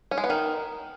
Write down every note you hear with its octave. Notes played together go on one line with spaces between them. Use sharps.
C#4
G#3
B3
D#3